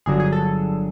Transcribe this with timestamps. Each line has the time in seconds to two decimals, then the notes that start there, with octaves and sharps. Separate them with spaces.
0.06 G1 G2 D3 F#3 G#4
0.20 G#4
0.32 A4